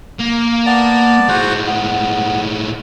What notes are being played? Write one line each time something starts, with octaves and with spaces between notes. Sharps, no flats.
A#3
B3 D5 A5
A2 G#3 F#4 C5 F#5
B3